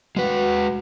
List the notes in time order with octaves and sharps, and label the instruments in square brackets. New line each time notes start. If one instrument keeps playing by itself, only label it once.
[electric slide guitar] G#3 B4 [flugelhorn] F#4